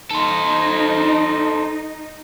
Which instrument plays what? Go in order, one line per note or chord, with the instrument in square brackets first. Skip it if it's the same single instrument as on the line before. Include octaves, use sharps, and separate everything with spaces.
[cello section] D#4 [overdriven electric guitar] A4 C5